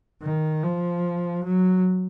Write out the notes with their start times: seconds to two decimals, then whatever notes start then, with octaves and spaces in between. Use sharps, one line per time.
0.22 D#3
0.63 F3
1.44 F#3